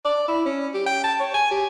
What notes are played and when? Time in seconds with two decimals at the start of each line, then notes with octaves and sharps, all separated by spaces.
0.05 D5
0.28 E4
0.45 C#4
0.74 G4
0.87 G5
1.04 A5
1.20 C#5
1.34 G#5
1.51 G4